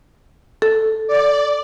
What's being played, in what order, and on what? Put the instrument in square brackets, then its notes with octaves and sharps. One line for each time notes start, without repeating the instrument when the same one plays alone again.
[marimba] A4
[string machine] D5